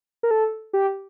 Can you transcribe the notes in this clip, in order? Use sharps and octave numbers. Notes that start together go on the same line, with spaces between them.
A#4
A4
G4